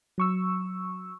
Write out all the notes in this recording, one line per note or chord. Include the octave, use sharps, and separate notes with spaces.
F#3 C#6 E6